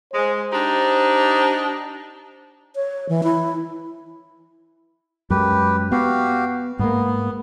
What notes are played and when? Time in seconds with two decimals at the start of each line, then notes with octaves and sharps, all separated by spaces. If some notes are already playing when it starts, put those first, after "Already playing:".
0.14 G#3 C5
0.51 D4 D#4 G4
2.76 C#5
3.09 E3
3.23 E4
5.30 F#2 G#3 G4 B4
5.92 B3 F#4 G4 F5
6.79 G#2 G#3 A#3 B3